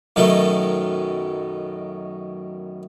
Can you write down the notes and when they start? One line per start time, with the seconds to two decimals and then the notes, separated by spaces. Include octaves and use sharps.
0.16 F#2 B2 D#3 A3